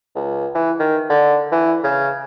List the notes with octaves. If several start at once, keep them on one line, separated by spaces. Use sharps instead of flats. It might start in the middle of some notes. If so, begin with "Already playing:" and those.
C#2
E3
D#3
D3
E3
C#3